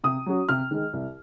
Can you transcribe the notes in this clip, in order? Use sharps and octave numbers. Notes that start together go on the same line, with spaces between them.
C3 D#6
F#3 C#4 F#4
C3 F6
D#3 G#3
C2